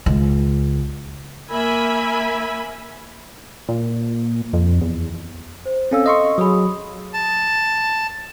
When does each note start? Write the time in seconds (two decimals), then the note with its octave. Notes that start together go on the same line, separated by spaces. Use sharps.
0.06 C#2
1.50 A#3 A#4 E5 G#5 B5
3.69 A#2
4.53 F2
4.81 E2
5.66 C5
5.91 C4 C#4 A4 F5 E6
6.06 D#5 C6 C#6
6.38 F#3 G#4 B5 D#6
7.14 A5